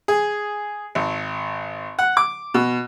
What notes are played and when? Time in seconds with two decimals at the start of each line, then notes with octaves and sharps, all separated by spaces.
0.08 G#4
0.95 G#1
1.99 F#5
2.17 D6
2.54 B2